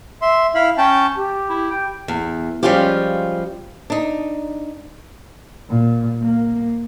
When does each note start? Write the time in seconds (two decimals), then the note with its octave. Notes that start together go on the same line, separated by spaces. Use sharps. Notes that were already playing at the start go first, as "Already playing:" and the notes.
0.22 E5 C6
0.55 E4 F5 B5
0.78 C#4 G5 A5
1.16 G4
1.49 E4
1.71 G5
2.08 E2
2.63 F3 G3 G#3 C#4 F4 G4
3.90 D4 D#4
5.69 A#2
6.22 A#3